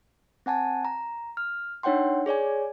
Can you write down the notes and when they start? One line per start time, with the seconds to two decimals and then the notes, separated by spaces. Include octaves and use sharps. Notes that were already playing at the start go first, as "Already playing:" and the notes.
0.46 C4 F#5 G#5 A5
0.85 A#5
1.37 F6
1.83 D4 D#4 C#5 F#5 G5 C6
2.26 G#4 C#5 D5 G#5